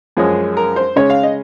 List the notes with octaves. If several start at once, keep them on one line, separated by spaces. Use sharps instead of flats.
F#2 F3 G#3 C#4 G#4
A#4
C5
C#3 G#3 C#4 C#5
F5
D#5